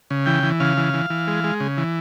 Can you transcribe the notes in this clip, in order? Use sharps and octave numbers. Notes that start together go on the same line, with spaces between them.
C#3
E3 G5
E3
C#3 F5
E3
E3
E3
G#3
G#3
C#3
E3